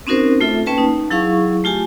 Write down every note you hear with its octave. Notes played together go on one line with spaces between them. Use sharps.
C4 C#4 D#4 F#4 A#4 C5
A3 F4 A4 E5
A#3 C#4 B4 G5 A5
D#4
F#3 E4 G#4 F5 C#6
A3 F4 G4 G#5